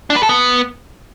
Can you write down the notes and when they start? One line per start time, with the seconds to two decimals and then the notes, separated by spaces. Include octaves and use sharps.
0.10 D4
0.16 B4
0.23 A4
0.29 B3